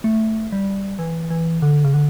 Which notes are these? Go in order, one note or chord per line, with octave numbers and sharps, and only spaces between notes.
A3
G3
E3
E3
D3
C#3
D3